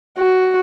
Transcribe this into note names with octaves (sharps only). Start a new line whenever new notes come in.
F#4